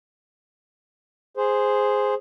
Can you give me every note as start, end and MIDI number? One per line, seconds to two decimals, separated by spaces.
1.37 2.14 68
1.37 2.14 72